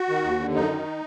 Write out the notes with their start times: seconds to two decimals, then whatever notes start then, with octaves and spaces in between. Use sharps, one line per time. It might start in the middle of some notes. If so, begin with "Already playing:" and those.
Already playing: F#4
0.09 D#3
0.24 D#2
0.40 D3
0.55 F#2 D#4
0.71 D#3